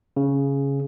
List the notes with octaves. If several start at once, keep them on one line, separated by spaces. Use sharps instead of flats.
C#3